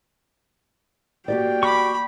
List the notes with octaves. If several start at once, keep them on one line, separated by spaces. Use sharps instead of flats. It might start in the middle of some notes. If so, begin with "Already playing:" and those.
A#3 F#4 G4 D5 G5
B5 C#6 D6